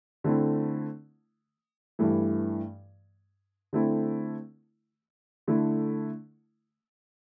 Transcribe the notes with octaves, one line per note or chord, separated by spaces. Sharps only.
D3 A3 C4 E4
G2 E3 A3
D3 A3 C4 E4
D3 A3 E4